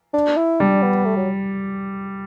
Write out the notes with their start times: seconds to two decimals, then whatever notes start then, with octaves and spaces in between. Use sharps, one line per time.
0.14 D4
0.37 E4
0.60 G3 D4
0.83 B3
1.05 A3
1.17 F#3